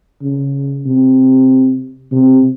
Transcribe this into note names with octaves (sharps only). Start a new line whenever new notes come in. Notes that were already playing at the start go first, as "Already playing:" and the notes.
C#3
C3
C3